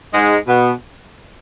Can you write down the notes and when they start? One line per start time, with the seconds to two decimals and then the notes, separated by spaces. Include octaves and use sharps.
0.12 G#2 G#3
0.47 B2 B3